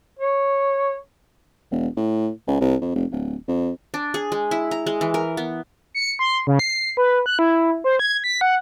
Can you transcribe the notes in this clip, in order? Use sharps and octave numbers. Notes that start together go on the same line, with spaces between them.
C#5
E1
A2
C#2
C2
F2
F1
D1
F2
D4
G#4
G#3
E4
A#5
G#3
E3
A#4
B3
C#7
C6
C#3
C7
B4
F#6
E4
C5
G#6
B6
F#5